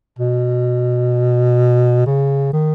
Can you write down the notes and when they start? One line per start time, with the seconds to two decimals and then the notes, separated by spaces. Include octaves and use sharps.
0.19 B2
2.06 C#3
2.53 D#3